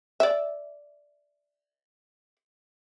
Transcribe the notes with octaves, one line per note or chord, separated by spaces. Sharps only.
D5 E5